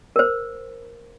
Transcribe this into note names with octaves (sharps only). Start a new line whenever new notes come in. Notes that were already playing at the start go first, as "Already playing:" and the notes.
A#4 C5